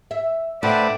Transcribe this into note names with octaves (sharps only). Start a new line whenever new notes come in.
E5
A2 D4 B4 C5 D5 E5 F#5